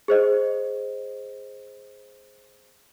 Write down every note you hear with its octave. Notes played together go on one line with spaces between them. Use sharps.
G#4 C5 D#5